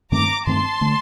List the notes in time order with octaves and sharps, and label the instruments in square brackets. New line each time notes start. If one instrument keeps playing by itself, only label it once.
[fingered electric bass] G2 D#3 A3 C4 [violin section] A#5 D6
[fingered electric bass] G2 D#3 A3 C4 [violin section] A5 C6
[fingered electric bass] D3 A3